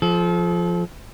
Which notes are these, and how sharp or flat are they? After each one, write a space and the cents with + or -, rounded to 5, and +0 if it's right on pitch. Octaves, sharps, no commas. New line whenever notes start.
F3 +0 A4 -35